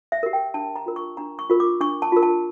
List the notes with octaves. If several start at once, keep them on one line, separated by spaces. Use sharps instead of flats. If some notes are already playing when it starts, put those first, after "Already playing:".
E5
G4 A#4
G5
D4 A5
A#5
F4 A#4
C#6
D4 A#5
C#6
F4 A#4
D6
D4 C#6
A5
F4 A#4
A5